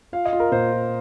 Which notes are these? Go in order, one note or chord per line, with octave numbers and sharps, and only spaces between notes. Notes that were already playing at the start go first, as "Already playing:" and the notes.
F4 F5
D#5
F4
A#4
A#2 C5
F4